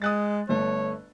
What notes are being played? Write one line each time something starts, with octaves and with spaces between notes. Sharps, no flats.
G#3 D#6 F#6 A6
G1 A3 C#5